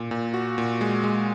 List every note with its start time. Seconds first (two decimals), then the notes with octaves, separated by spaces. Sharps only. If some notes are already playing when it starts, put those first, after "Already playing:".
Already playing: A#2
0.11 A#2
0.34 F#4
0.58 A#2
0.81 G#3
1.04 G#3